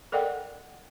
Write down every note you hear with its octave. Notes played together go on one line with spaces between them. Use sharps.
A4 A#4 D5 D#5 F#5 G5